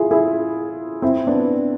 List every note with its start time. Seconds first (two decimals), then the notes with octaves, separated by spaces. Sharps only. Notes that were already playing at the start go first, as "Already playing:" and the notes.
Already playing: E4 F4 G#4
0.11 E4 G#4
1.02 C4 E4
1.27 B3 D4